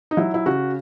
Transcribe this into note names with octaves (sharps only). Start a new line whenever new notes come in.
D#4
F#3 E4
E4
C#3 F#4